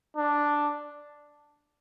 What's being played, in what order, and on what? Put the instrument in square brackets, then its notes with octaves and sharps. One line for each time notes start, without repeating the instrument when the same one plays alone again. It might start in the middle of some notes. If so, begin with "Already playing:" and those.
[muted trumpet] D4